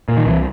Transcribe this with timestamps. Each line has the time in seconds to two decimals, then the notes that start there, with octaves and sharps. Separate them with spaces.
0.08 A#2
0.17 D#3
0.26 C2 E3